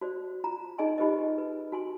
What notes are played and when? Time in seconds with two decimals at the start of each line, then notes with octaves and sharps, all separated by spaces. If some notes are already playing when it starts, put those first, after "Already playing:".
0.01 F#4 C5 D5
0.44 F4 A#5
0.78 D#4 G#4 D5 D#5 G#5 C6
0.98 D#4 F4 G4 B4 C5 D#5
1.38 B4
1.72 F#4 G#5 C6